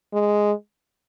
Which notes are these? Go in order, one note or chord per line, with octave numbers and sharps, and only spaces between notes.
G#3